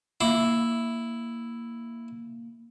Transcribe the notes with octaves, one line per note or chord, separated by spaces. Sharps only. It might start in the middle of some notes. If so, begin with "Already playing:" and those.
A#3 E4